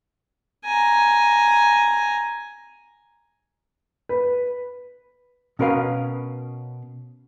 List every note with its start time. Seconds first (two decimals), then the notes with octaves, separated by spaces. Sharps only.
0.65 G#5 A#5
4.09 B4
5.59 B2 C#4 A#4 B4 F5